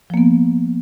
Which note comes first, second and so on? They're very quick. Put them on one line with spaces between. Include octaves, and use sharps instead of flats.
F3 A#3 B3